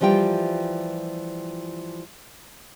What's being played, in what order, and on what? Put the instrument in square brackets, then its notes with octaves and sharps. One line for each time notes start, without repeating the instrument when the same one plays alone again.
[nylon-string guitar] E3 F3 G3 F4 G5